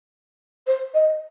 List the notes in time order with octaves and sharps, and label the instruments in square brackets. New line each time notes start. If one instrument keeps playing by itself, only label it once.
[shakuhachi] C5
D#5